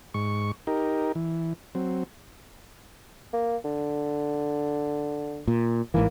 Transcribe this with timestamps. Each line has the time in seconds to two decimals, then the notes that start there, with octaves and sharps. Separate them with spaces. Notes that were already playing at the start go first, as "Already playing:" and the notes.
0.14 G#2 C#6
0.67 D#4 G4 A#4
1.15 E3
1.75 F#3 C4
3.33 A#3
3.65 D3
5.48 A#2
5.94 A1 G#2 E3 A#3